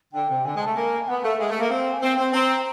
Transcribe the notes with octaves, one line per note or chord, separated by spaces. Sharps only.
D3 G5
C3
D3 G#5
G#3
A3 A5
A#3 G#5
B3 F#5
A3 F5
G#3 E5
A3
A#3
C4 F5
G#5
C4 G5
C4
C4 A#5